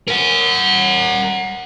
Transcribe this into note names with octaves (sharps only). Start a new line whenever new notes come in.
A#4 F#5